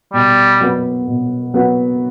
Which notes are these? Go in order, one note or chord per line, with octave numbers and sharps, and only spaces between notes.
B2 G3
F#3 B3 F#4 B4
B2
F#3 B3 F#4 B4